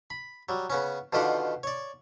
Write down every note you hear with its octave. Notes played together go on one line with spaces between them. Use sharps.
B5
F#3 G3
C#3 B3 C#4
B2 D3 D#3 F4 G4 F#5
C#5 D5